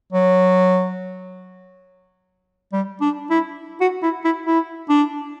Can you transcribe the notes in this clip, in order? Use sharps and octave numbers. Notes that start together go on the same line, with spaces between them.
F#3
G3
D4
E4
F#4
E4
E4
E4
D4